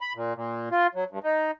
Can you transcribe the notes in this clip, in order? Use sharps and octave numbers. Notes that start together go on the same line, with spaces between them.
B5
A#2
A#2
F4
F#3
G2
D#4